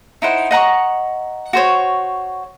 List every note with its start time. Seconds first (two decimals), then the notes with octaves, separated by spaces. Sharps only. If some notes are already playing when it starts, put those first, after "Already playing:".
0.22 D#4 E4 C5 F#5
0.51 D#5 F#5 A#5 C#6
1.53 F#4 C5 C#5